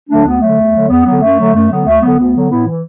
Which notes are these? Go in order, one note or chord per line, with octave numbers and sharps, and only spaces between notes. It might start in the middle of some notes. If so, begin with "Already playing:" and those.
D3 F#3 A3 D4
D2 B3
D3 F#3 A3
E2
D3 F#3
E2 B3
D3 F#3 B3
F#2 A3
D3 F#3
F#2 A3
D3 F#3 B3
D2 A3
D3 F#3 B3
D2 B3
D3 F#3
A2 B3 E4
E3